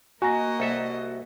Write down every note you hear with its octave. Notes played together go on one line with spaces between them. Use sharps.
A#3 F#4 D#5 G#5 A#5 A#6
C2 A4 E5